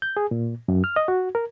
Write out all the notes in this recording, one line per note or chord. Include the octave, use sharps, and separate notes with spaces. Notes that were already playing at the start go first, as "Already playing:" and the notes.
G6
G#4
A#2
F#2
F6
D#5
F#4
A#4